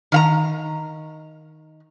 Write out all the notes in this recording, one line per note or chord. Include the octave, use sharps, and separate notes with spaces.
D#3 F5 A#5